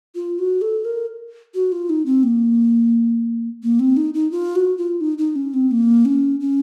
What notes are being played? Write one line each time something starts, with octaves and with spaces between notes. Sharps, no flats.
F4
F#4
A4
A#4
F#4
F4
D#4
C4
A#3
A#3
C4
D#4
D#4
F4
F#4
F4
D#4
D#4
C#4
C4
A#3
C#4
C#4